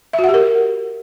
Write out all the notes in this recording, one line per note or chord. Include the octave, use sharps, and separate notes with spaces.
E5
F#4
F#5
G4
A#4